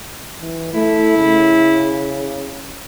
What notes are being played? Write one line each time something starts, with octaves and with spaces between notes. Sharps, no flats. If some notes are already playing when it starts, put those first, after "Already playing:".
E3
A3 E4
C#3